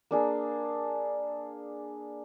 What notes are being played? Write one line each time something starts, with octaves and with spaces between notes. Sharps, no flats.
A#3 D4 G#4